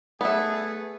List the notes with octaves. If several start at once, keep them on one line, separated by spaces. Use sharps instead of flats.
A3 B3 G#4 E5